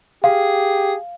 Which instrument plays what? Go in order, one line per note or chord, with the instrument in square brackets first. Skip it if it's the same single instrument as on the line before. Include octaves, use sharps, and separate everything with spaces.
[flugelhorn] G4 [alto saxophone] G#4 [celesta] F5